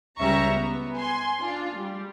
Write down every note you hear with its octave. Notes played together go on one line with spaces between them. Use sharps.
C#2 G3 C#4 E5 A#5 C#6
B3
G#5 C6
D4 F4
G3